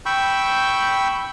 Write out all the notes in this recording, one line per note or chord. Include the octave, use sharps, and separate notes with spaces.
G5 B5 C#6 E6 G6